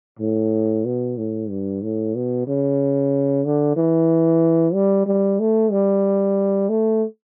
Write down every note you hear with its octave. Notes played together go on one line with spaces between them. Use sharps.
A2
B2
A2
G2
A2
B2
C#3
D3
E3
G3
G3
A3
G3
A3